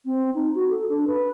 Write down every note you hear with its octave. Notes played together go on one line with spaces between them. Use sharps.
C4
D#4
F#4
A4
D4
B4